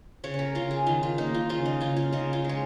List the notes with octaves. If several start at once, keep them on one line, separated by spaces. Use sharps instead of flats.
C#3 C#5
C#5
A#4
C#3 F4
G#4
D#3 F4
F4
A#3 D#4
F4
C#3 F4
D#4
C#3 F4
F4
C#3 D#4
F4
G#3 C#5